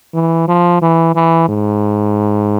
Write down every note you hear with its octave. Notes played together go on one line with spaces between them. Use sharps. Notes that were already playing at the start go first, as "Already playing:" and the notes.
E3
F3
E3
E3
G#2